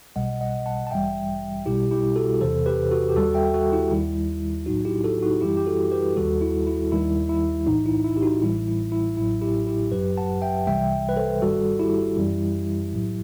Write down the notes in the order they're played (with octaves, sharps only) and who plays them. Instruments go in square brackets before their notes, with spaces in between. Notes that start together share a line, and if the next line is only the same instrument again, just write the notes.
[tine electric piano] B1 B2 G3 D#5 F#5
D#5 F#5
F#5 A5
A5
A1 G2 E3 G3 E5 G5
B1 B2 G3 E4 G4
E4 G4
F#4 A4
E2 C3 E3 A4 C5
G4 B4
F#4 A4
G4
D#2 D#3 G3 F#4 A4
E5 G5
F#4 A4
E4 G4
D#2 D#3 G3 E4
B1 A2 F#3 D#4 F#4
E4 G4
F#4 A4
D#4 F#4
F#2 E3 G3 E4 G4
G4
F#4 A4
G4 B4
D#2 D#3 G3 F#4 A4
E4
E4
D#2 D#3 G3 E4
E4
B1 A2 E3 D#4
E4
E4
G4
D#4 F#4
A1 A2 E3 G3 E4
E4
E4
A1 A2 F#3 E4
E4 G4
E4 G4
G1 F#2 F#3 G4 B4
F#5 A5
E5 G5
C2 C3 E3 G3 E5 G5
B4
A4 C5
G1 G2 D#3 G3 F#4 A4
E4 G4
F#2 E3 G3
B1 A2 F#3